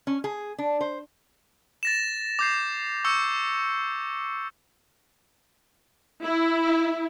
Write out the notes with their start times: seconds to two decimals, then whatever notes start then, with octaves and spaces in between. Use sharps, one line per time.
0.07 C#4
0.24 G#4
0.58 D4
0.81 C5
1.83 A6 A#6 E7
2.39 D6 G6 C7
3.05 C#6 E6 G6 C#7
6.24 E4